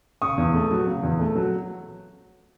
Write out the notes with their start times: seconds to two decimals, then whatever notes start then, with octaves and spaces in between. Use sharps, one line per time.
0.22 C#3 C#6 D#6
0.38 E2
0.54 A3
0.71 F#3
0.87 C#3
1.03 E2
1.19 A3
1.35 F#3